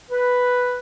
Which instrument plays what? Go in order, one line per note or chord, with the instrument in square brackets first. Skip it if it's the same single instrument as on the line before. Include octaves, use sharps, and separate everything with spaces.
[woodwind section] B4